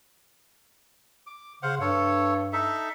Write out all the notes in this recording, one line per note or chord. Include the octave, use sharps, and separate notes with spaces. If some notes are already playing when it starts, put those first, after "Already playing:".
D6
C#3 C5 F5 F#5
G2 A4 C#5
D#4 A4 E5